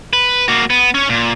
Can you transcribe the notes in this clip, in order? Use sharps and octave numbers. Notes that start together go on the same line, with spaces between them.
B4
A#3 F#4
B3
C#4 C#5
A#2